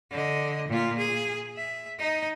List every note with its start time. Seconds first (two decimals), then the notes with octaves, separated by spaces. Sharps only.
0.11 D3 D#5
0.69 A#2 F4
0.99 G#4
1.57 E5
1.99 D#4 D#5